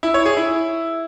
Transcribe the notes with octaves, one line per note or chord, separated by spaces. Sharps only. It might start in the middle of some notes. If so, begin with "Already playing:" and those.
E4
C#5
G#4
E4